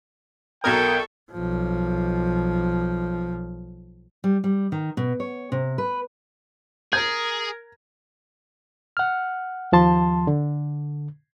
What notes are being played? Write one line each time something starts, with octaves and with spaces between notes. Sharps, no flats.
B1 B2 A4 A#4 G5 C#6 D#6 G#6
B1 F3
G3
G3
D#3
B2
C#5
C3
B4
G#4 A#4 G#6
F#5 F6
D#2 F3 A5 C6
D3